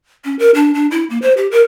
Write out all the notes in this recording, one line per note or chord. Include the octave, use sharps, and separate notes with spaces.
C#4
A#4
D4
D4
E4
A#3
C5
G4
A#4